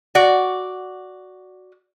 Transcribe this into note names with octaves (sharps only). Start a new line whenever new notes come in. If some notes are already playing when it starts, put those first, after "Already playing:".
F#4 D5